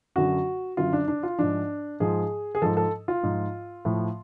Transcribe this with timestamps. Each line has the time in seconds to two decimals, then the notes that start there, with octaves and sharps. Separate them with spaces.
0.16 F#2 D3 F#3 F#4
0.77 F#2 D3 F#3 F4
0.93 D4
1.08 D4
1.23 F4
1.39 G#2 F3 D4
2.00 G#2 F3 G#4
2.55 G#4
2.62 G#2 F3 A4
2.77 A4
3.08 F4
3.23 G#2 F3
3.85 A2 F3